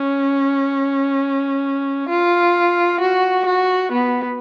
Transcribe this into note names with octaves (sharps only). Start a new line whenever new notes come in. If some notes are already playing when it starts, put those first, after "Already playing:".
Already playing: C#4
F4
F#4
F#4
B3